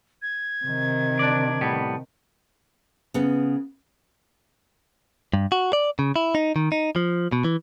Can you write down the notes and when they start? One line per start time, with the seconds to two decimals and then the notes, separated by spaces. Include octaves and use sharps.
0.22 G#6
0.65 C3 D#3
1.19 D4 D5
1.61 A2 G3 B3
3.14 C#3 B3
5.33 G2
5.52 F#4
5.73 D5
5.99 C#3
6.16 E4
6.35 D#4
6.56 D#3
6.72 D#4
6.96 F3
7.32 B2
7.44 E3